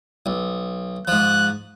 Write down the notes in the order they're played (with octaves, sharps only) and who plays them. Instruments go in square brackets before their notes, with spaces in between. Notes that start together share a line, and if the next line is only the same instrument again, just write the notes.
[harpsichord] B1
[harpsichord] G#2 F3 [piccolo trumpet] F#6